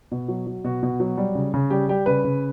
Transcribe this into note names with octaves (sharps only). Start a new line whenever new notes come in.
B2
F#3
F#3
B2 F#4
B2
F#3
G3
C#3
C#3
G3 G4
G3 G4
C#3 B4
C#3